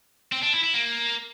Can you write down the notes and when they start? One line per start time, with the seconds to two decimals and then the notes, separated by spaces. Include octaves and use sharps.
0.32 C4
0.42 D4
0.53 E4
0.63 E4
0.74 A#3